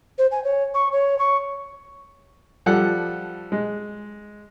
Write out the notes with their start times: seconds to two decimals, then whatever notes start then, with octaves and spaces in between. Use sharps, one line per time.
0.18 C5
0.31 G#5
0.44 C#5
0.74 C#6
0.93 C#5
1.19 C#6
2.66 F3 G3 A4 F#5 F#6
3.52 G#3